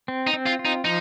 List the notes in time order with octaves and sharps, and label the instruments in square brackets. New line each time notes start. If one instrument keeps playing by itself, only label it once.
[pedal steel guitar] C4
[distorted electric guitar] D#4
[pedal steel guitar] C4
[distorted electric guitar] F4
[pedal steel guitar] F4
[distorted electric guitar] D#4
[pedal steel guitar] F3 [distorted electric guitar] D#4